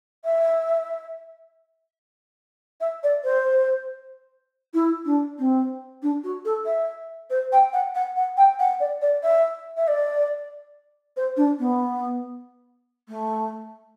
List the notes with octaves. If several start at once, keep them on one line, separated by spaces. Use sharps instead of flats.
E5
E5
D5
C5
E4
D4
C4
D4
F#4
A4
E5
C5
G5
F#5
F#5
F#5
G5
F#5
D5
D5
E5
E5
D5
C5
D4
B3
A3